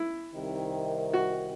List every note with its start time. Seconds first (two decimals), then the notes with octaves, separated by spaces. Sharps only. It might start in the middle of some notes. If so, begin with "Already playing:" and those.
Already playing: E4
0.32 C2 C3 D#3
1.13 F#4